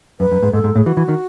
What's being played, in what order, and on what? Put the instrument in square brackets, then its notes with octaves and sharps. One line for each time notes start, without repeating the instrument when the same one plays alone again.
[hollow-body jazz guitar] F#2 [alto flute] B4
[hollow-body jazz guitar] F#2
G#2
[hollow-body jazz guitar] G#2 [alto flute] A4
[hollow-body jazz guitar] G#2
[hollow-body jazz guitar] A2 [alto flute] G#4
[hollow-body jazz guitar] E3 [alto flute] F#4
[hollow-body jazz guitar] E3
D#3